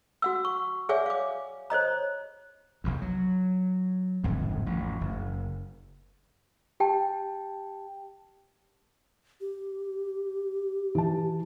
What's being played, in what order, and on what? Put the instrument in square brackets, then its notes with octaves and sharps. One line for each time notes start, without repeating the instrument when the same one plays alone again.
[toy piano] F#4 F#5 E6
C#6
G#4 C#5 D5 E5 F#5 G#5
F5 D6
C5 C#5 D#5 A#5
[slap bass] F1 B1 E2
F#3
D1 G#1 F2 G#2
A1 F2
F#1
[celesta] G4 G5 A5
[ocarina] G4
[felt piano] E3 A5